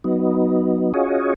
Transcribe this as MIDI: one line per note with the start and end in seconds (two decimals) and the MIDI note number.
0.04 0.93 54
0.04 0.93 59
0.04 0.93 63
0.94 1.34 61
0.94 1.34 65
0.94 1.34 66
0.94 1.34 68
0.94 1.34 73
0.94 1.34 75